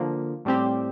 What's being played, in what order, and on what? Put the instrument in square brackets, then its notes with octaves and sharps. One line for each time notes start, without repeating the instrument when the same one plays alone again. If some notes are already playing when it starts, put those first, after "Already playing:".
Already playing: [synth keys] D3 F3 A#3
A2 G3 C4 G4